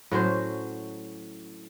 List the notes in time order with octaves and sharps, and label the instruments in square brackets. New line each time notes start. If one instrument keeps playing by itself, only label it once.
[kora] A2 F#3 C#4 C5